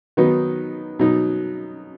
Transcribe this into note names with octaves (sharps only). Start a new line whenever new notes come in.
D#3 F#3 B3 D#4
B2 F#3 D#4